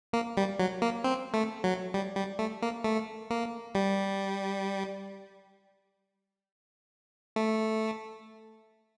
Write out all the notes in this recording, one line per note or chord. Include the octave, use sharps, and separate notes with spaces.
A#3
G3
F#3
A#3
C4
A3
F#3
G3
G3
A3
A#3
A3
A#3
G3
A3